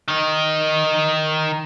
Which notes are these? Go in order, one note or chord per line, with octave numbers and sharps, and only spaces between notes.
D#3 D#4